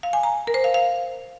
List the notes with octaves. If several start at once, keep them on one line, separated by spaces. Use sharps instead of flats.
F5
G#5
A#5
A#4
C5
F5
F5